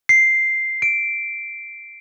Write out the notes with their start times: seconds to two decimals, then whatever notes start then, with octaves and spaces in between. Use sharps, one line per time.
0.09 C7
0.82 D7